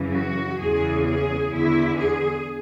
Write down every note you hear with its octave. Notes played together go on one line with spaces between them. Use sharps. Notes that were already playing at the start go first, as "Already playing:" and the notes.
Already playing: F#2 C#3 E3
F#4
E2 C#3 E3 G#4
G#4
E2 D3 E4
G#4